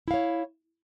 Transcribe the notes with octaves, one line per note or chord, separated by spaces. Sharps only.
E4 C#5 F5